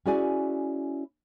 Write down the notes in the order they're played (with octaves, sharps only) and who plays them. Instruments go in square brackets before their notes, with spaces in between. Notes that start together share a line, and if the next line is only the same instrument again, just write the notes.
[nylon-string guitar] C#4 E4 F#4 G#4 D5 G#5